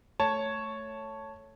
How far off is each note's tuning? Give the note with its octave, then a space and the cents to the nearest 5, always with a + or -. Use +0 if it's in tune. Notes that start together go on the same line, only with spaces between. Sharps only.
A3 +0 C#5 +0 A5 +0